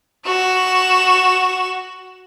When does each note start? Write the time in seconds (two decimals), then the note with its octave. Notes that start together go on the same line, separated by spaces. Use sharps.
0.26 F#4 E7